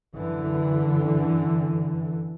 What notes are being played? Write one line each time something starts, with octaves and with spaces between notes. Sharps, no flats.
F#2 D3 E3